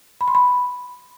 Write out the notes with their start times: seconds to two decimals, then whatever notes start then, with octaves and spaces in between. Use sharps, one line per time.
0.21 B5
0.28 C6
0.35 B5